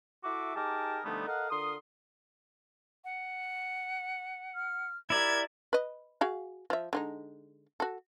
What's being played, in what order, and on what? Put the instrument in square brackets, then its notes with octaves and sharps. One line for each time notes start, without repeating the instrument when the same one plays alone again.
[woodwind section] E4 F#4 A4 E5 D6
D#4 G4 G#4 A#4 A5 D6
D3 F3 G3 A3 B3 D#4
A4 A#4 D#5 F5 F#5
D3 F4 A#4 C6 D#6
[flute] F#5
[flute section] F6
[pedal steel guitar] E4 D5 [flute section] G4 A#4 E5 [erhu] G#6
[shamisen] B4 D#5
F#4 G#4 F5
F3 E5
D3 G#3 D#4
F#4 A4